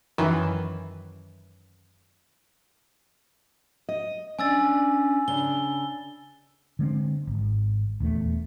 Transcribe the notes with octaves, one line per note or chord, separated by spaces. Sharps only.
F#2 D#3 E3
D#5
C#4 D4 G#5 E6 A6
C#3 D4 G7
D3 G#3 C4
G#1
D#1 E2 F3 A3